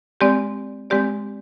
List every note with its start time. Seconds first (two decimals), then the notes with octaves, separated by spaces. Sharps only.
0.21 G#3 C4 G4 D5
0.90 G#3 C4 G4 D5